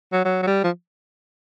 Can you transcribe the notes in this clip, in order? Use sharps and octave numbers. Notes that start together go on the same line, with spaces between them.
F#3
F#3
F#3
G3
F3